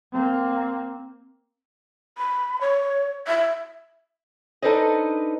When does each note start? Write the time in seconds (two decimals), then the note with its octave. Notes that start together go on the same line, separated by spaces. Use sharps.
0.13 A#3 C4
2.18 B5
2.61 C#5
3.27 E5
4.62 D4 D#4 A4 B4 C5 D#5